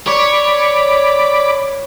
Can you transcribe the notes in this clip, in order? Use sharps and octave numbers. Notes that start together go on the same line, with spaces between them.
C#5 D5 B5 D6